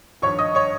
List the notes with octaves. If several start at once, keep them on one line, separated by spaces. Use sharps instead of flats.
G#1 G2 F3 C#5 C#6
D#5 D#6
C#5 C#6